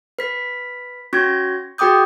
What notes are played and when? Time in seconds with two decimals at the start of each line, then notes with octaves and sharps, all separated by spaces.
0.19 B4 B6
1.13 C#4 F#4 C#6 G#6 A#6
1.78 F#4 G#4 G5 D6 D#6 G6